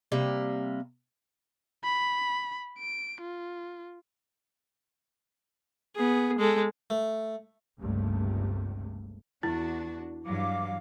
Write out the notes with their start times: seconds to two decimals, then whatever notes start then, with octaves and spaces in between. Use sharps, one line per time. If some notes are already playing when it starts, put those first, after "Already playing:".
0.12 C3 G3 A#3
1.84 B5
2.79 D7
3.21 F4
5.96 B3 G#4
6.38 G#3 A4
6.90 A3
7.78 G1 C#2 G2 C3 A3 A#3
9.43 E2 D4 E4 F#4
10.26 G2 E3 F#3 F5 D6